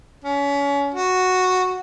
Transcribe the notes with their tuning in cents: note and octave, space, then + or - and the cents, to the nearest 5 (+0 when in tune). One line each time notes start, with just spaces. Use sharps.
C#4 +30
F#4 -5